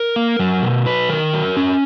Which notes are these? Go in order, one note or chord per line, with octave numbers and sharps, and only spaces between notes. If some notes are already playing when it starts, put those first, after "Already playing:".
Already playing: A#4
A#3
F#3
B2
F#3 B4
D#3 A#4
F#3
C#4